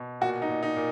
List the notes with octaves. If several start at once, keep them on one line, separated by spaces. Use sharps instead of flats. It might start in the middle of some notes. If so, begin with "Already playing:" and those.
Already playing: B2
A#2 F#4
D#4
A#2
D#4
A#2